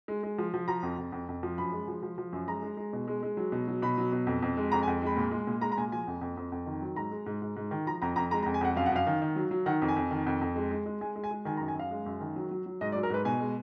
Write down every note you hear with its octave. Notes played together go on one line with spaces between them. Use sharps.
G#3
G#3
F3
F3
F3 A#5
F2
F2
F2
F2
F3
F#2 B5
G#3
F3
F3
F3
F#2
G#3 A#5
G#3
G#3
B2
G#3
G#3
F#3
B2
F#3
B2 B5
F#3
B2
F2
F2
G#3
F2 A#5
G#5
F2
G#3 B5
A#2
G#3
A#2
G#3 A#5
A#5
A#2 G#5
F3 G#5
F2
F2
F2
F2
D#3
F#3
G#2 A#5
G#3
G#2
G#2
G#2
D#3
F3 A#5
F2 A#5
F2 A#5
G#3 A#5
A#5
F2
G#5
F2 F#5
F#2 F5
F#5
F#2 F5
D#3
D#3
F#3
F#3
D#3 F#5
F2
G#5
F2
D#3
F2
F2
G#3
G#3
G#3
G#3 G#5
G#3
G#5
G#3
D#3 G#5
A#5
F#2
G#5
F#2 F5
G#3
F#2
D#3
F#3
F#3
F#3
G#2 D#5
D5
F#3
A#4
G#2 B4
B2 G#5
G#3